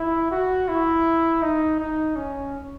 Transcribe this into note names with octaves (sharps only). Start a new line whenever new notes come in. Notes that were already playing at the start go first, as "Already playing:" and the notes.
Already playing: E4
F#4
E4
D#4
D#4
C#4